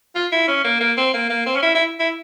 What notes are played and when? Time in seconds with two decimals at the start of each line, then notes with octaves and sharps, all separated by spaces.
0.15 F4
0.32 E4
0.48 C#4
0.64 A#3
0.81 A#3
0.97 C4
1.14 A#3
1.30 A#3
1.46 C4
1.56 C#4
1.62 E4
1.75 E4
2.00 E4